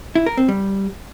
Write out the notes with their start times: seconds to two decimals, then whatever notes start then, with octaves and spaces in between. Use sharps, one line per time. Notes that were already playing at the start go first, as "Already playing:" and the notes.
0.15 E4
0.26 A#4
0.37 C4
0.48 G3